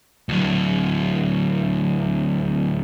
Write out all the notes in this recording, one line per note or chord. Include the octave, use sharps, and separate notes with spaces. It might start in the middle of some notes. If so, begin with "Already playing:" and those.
D2 F#3